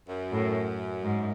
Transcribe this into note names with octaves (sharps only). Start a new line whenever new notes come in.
F#2
A2
G#2